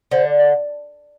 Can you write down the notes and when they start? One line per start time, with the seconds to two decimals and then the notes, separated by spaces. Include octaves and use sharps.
0.11 D3 C5
0.26 D5
0.39 D5